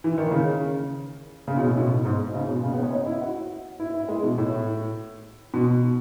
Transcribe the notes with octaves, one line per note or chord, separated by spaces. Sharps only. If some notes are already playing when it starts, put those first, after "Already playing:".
E3
D#3
C#3
C#3
B2
A2
B2
G#2
C#3
B2
C#3
B3
C#4
D#4
E4
F#4
E4
E4
G#3
B2
A2
B2